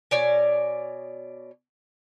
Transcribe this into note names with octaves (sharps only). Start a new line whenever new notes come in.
B2 C#5 D5 G#5